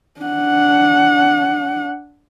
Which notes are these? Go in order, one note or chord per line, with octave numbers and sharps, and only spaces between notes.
D4 F#5